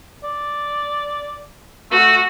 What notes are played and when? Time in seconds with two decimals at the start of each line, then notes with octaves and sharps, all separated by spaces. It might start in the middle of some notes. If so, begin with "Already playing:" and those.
0.24 D5
1.91 A3 F#4